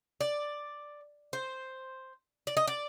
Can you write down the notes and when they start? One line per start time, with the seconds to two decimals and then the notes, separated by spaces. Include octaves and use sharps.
0.21 D5
1.33 C5
2.47 D5
2.57 D#5
2.68 D5